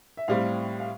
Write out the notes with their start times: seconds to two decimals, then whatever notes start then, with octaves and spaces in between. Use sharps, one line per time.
0.17 E5
0.28 A2 G3 C4 F5
0.80 F5